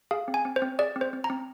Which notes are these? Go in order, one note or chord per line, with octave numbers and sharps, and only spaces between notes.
G#4 F5
C4
G#5
C4
C5
C4
G#4 D5
C4
C5
C4
A#5
C4